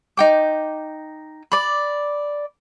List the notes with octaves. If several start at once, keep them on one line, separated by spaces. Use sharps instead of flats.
D#4 G5 D6
D5 B5